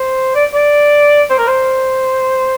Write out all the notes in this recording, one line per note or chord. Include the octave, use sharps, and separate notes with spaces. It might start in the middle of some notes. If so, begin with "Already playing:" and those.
Already playing: C5
D5
D5
C5
A#4
C5